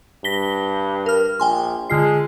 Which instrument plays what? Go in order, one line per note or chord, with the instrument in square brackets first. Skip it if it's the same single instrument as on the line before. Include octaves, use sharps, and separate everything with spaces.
[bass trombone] G2 [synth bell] A#6 B6 G7
[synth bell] A#4 F6
[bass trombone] A#1 [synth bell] G5 G#5 C6
[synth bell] D3 F4 C7 [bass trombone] G#3